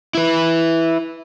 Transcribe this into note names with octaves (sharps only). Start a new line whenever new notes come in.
E4 B4